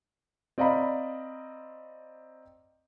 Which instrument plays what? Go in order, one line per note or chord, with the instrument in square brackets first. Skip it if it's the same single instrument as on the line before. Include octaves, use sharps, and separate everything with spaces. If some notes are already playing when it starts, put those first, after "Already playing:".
[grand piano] C4 D5 D#5 F5 A#5 B5